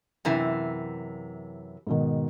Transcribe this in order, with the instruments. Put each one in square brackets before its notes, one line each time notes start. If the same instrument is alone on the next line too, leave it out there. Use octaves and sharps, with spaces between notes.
[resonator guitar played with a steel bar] F#2 C3 E3
[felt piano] G#2 B2 D#3